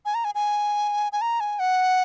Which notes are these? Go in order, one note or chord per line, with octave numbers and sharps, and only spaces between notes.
G#5
A#5
G#5
G#5
G#5
A#5
G#5
F#5